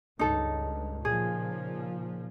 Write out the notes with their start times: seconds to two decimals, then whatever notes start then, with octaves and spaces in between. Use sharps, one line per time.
0.19 C#2 G2 D#4 A4
1.05 A#2 C#3 F3 G#4